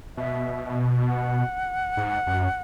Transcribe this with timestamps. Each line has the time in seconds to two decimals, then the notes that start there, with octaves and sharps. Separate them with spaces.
0.17 B2 E5
1.08 F#5
1.97 G#2
2.27 F#2